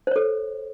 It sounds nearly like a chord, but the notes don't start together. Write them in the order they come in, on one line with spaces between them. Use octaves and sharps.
C5 C#5 A4